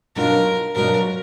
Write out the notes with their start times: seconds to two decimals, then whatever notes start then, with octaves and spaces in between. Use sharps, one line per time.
0.16 B2 F#3 B3 D4 F4 A#4
0.75 B2 F#3 B3 D4 F4 A#4